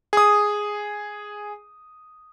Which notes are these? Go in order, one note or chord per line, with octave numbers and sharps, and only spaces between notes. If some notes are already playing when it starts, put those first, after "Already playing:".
G#4 D#6